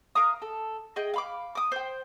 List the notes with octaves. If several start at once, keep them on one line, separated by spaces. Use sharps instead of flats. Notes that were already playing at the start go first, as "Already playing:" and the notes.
A#4 F5 A#5 D#6
A4
G#4 D#5 G5
F5 B5 D6
D6 D#6
C5 G5